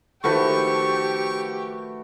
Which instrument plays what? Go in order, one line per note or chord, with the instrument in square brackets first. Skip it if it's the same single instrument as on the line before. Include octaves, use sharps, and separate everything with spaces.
[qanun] D#3 F3 A4 [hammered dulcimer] A3 F#4 B4 [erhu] G4 [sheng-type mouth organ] C#6